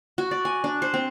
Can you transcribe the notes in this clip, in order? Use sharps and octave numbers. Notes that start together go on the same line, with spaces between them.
F#4
D5
G#5
D4
C5
C4